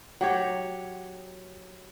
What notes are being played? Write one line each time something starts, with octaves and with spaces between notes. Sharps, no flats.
F#3 G4 C#5